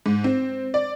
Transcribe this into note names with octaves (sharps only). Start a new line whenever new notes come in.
G#2
C4
D5